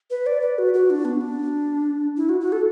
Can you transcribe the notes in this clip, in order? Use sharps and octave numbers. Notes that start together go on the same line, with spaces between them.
B4
D5
B4
F#4
F#4
D4
B3
D4
E4
F#4
F#4
A4